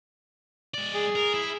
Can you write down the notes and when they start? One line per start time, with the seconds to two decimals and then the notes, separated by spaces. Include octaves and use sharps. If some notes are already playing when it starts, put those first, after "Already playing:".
0.74 G#3 D5
0.95 G#4
1.16 A#4
1.34 E4